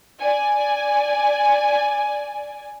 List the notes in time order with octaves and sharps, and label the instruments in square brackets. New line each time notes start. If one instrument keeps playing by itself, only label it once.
[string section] D5 G#5